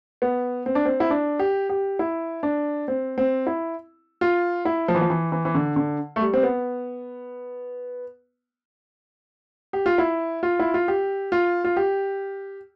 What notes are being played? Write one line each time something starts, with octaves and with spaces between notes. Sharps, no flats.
B3
C4
D4
C4
E4
D4
G4
G4
E4
D4
C4
C4
E4
F4
E4
F3
E3
F3
E3
E3
E3
D3
D3
A3
G3
C4
B3
G4
F4
E4
F4
E4
F4
G4
F4
F4
G4